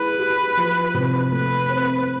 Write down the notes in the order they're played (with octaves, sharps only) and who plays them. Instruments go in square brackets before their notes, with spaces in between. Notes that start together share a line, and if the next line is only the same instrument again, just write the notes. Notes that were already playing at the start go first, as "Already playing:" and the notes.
Already playing: [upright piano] G#3 E4 [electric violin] B4
[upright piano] G4
F3
C3
[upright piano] A3 [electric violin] B4
[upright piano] C4